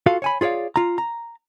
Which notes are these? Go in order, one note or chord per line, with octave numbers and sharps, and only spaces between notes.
F4 F#4 A4 F5
C#5 G#5 B5
F4 G#4 C#5 D5 F5
F4 A#5
A#5